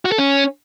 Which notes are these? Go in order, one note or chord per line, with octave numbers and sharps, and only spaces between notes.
F#4
A4
C#4